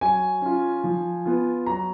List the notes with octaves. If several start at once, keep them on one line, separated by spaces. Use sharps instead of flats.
F#3 G#5
C#4 F4
F3
B3 F4
F#3 A#5